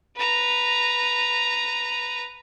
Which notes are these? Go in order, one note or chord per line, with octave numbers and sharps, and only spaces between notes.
B4 A#5